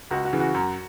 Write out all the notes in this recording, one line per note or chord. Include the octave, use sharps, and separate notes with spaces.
C#2 F#4
F#4
C#3 E3
F#4
F#2